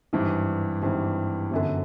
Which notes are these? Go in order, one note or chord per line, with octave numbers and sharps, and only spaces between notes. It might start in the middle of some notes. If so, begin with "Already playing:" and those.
G#1 G2 E3
G#1 G2 E3
G1 F#2 D3